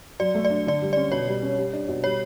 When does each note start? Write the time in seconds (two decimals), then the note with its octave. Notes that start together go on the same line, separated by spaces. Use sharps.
0.20 F#3 D5
0.35 A3
0.45 D5
0.50 D4
0.66 D3 D5
0.82 G3
0.93 D5
0.97 C#4
1.12 B2 C#5
1.27 G3
1.42 C#4
1.58 G3
1.73 D4
1.88 B2
2.04 G3 C#5